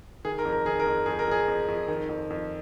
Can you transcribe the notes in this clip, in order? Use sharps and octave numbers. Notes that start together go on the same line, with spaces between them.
D#3 G#4
A#4
F2
A#4
D#3 G#4
A#4
F2
F2 G#4
A#4
F2 G#4
F2
F2
D#3
F2
F2